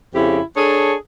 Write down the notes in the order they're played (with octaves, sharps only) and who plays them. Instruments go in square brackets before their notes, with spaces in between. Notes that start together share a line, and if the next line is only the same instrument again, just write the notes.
[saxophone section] F2 C#3 E4 G4
D4 G#4 A4 C#5